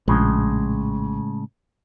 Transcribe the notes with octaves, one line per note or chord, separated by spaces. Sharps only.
A#1 A2 C#3 G#3